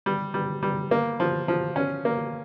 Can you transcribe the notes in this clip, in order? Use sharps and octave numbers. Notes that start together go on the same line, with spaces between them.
G3
G3
G3
A#3
F3
F3
C#4
A#3